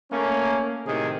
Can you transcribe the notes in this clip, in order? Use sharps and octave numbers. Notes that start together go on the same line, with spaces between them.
A3 A#3 C#4
A2 C3 D#3 G#4